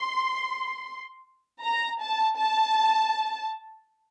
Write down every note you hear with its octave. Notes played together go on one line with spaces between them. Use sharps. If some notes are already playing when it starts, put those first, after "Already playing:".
Already playing: C6
A#5
A5
A5